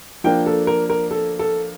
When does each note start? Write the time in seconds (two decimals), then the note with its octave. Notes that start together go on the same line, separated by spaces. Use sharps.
0.24 F3 A#3 D4 G5
0.46 A4
0.67 A#4
0.90 A#4
1.11 A4
1.39 A4